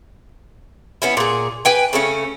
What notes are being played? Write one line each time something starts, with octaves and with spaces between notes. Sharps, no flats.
B3 C#4 E4
A#2 G#4
B4 G5 G#5
C#3 A3 C#4